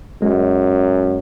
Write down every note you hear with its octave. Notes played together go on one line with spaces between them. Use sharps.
F#2 G#3